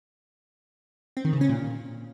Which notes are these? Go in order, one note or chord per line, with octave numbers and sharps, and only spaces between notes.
C4
D#3
C#3
C#4
A#2